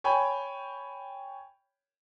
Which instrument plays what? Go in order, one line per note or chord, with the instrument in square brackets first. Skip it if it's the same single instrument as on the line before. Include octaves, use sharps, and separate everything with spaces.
[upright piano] C#5 G5 G#5 B5